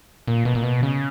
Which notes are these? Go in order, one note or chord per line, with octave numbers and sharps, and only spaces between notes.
A#2
B2
A#2
B2
C#3